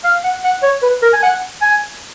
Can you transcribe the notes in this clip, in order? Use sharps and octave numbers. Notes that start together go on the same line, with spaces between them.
F5
F#5
F#5
C#5
B4
A#4
G#5
F#5
G#5